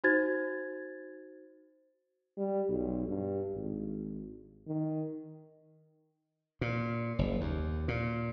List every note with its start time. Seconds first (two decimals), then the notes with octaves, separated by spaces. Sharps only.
0.04 D#4 F#4 C5 G#6 A6
2.38 G3
2.69 B1
3.08 G2
3.55 G#1
4.67 D#3
6.61 A#2
7.19 F#1
7.41 D#2
7.88 A#2